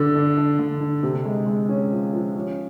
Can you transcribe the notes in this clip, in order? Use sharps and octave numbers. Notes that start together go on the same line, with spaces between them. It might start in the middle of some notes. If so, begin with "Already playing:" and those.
Already playing: D3 D4
D4
D4
D3
D4
C3
G#3
G#3
C#4
F3
F3
C#4